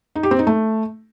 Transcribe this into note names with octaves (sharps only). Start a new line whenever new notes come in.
D#4
G4
C4
D#4
A3